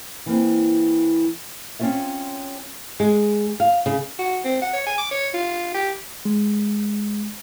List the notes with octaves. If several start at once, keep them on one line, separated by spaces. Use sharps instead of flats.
E3 A#3 C4
C4 C#4 E4 F4 C#5 E5
G#3
F5
C#3
F#4
C4
F#5
C#5
G#5
D6
C#5
F4
G4
G#3